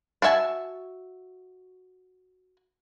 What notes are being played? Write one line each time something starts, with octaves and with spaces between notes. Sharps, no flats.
D4 F#4 E5 G#5 A5